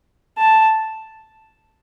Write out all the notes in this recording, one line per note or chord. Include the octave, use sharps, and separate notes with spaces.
A5